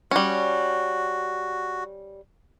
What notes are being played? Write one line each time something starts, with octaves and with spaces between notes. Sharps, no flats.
G3 C#4 F#4